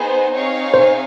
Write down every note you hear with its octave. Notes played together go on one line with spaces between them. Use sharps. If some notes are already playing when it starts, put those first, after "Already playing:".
Already playing: B3 D#4 G#4 C5
C4 D#4 G#4 C#5 F5
C5